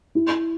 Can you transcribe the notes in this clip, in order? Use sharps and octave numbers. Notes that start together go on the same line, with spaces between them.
E4